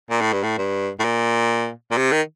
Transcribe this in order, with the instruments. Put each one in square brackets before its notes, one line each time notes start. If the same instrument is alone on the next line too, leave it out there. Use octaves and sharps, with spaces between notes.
[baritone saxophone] A#2
A2
G2
A2
G2
A2
A#2
A#2
C3
D#3